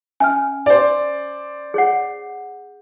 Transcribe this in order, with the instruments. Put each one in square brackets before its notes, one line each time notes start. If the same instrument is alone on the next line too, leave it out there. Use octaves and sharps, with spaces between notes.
[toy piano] C#4 E5 [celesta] G#5 F6
[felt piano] C5 D5
[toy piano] G#4 C#5 F#5